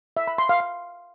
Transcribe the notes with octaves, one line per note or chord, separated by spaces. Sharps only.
E5
B5
C6
F5
F5